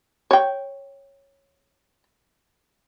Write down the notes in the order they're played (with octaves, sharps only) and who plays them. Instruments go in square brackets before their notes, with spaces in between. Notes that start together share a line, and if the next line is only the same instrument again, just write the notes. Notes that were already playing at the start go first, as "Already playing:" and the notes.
[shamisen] C#5 G5